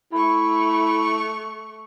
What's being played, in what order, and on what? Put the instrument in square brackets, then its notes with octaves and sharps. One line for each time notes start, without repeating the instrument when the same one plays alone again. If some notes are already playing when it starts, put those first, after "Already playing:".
[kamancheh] A3 C#6 [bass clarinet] E4